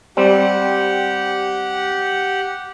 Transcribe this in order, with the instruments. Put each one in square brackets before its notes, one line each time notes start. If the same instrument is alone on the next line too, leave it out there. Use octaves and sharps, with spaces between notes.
[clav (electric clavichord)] G3 C4 [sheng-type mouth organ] G4 F#5